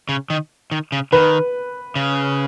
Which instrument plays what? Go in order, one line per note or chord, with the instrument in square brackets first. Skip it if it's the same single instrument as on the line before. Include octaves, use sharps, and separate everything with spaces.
[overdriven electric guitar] C#3
D#3
D#3
C#3
[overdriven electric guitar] D#3 [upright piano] B4
[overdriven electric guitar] C#3